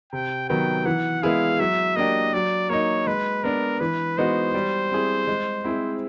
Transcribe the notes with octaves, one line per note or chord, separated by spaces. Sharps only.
C3 G5
D#3 F#3 B3 G5
E3 F#5
G#3 B3 E4 G#4 F5
F#3 E5
A#3 D4 G4 D#5
F#3 D5
A#3 D#4 C#5
G#3 B4
B3 D4 A#4
E3 B4
G#3 B3 D#4 F#4 C5
G3
C4 E4 G#4
G#3
C4 E4 G#4